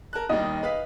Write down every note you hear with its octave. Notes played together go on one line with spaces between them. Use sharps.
A#4 A5 F#6
D#2 D#3 G3 D#5
B4 F5 B6